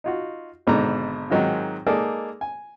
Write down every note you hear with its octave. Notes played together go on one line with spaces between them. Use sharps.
D#4 F4 F#4
G#1 G#2 B2 D3 A#5 D6
G#2 D#3 F#3 G#3 C4 F4
G#3 A#3 D#4 G#4 A4 D5
G#5